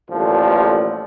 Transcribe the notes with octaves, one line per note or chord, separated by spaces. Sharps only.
A1 G2 A#2 D3 F3